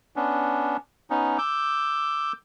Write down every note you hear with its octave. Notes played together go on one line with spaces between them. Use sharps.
B3 C#4 D4
B3 C#4 D#4
D6 E6 G6